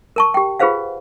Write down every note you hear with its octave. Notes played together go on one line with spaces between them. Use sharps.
A#4 A5 C#6
G4 G5
F4 G#4 B4 C5 F5 F#5